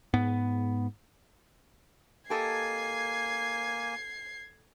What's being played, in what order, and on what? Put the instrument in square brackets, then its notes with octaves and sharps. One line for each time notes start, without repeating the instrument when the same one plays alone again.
[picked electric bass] G#2 B3
[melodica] A#3 G#5 [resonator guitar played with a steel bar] G4 A4 D#5 [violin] G#6 C7